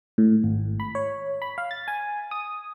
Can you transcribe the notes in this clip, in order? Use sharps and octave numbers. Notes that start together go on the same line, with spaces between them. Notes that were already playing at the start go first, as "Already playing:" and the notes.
A2
G#1
B5
C#5
B5
F5
A6
G#5
D#6